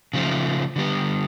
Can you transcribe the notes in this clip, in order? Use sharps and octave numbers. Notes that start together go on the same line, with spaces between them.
C#3 F3 A3
D3 G3 B3